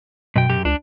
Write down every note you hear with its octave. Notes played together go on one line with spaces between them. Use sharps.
F#2 B2 G5
F#2 G4
C#2 D4